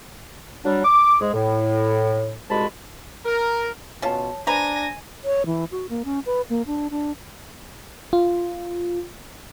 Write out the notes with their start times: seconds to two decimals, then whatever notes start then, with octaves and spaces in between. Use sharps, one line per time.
0.65 F#3 G3 D4
0.85 D6
1.21 G#2 G#3 G#4
1.34 A2
2.50 C2 G#2 G#3 F#4 A5 B5
3.26 A#4
4.02 B2 C#4 F4 C#5 A5
4.47 D4 B4 C5 D#5 G#5 A#5 A#6
5.24 C#5
5.46 E3
5.71 F#4
5.89 A#3
6.05 C#4
6.26 B4
6.50 A#3
6.66 D4
6.91 D4
8.13 F4